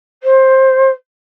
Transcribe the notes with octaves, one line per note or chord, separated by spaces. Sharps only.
C5